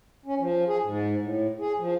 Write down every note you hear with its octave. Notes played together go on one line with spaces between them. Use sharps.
C#4
F3
G#4
G#2
A2
G#4
F3